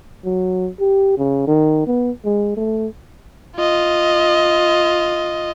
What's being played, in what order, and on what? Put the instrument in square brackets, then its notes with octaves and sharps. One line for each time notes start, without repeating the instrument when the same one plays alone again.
[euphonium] F#3
G4
C#3
D#3
B3
G#3
A3
[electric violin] F4 D#5